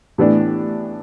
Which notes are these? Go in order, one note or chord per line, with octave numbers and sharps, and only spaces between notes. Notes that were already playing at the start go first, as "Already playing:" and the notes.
A2 E3 B3 D4 G4